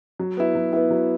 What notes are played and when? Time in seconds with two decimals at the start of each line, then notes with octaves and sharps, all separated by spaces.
0.19 F#3
0.37 B3 E4
0.55 F#3
0.73 B3 E4
0.91 F#3